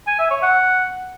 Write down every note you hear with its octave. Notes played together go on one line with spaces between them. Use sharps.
G#5
E5
C#5
F#5